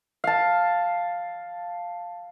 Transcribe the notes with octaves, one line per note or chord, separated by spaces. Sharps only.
F5 A5